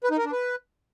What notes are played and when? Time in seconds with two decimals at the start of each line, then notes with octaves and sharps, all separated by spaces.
0.04 B4
0.11 D#4
0.18 A#4
0.25 D4
0.32 B4